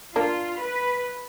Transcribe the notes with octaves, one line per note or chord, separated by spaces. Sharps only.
A#3 D4 F4
B4